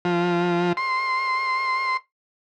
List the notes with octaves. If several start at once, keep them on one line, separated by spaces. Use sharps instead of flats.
F3
C6